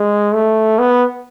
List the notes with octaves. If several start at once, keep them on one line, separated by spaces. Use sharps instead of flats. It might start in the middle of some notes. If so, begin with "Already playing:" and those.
Already playing: G#3
A3
B3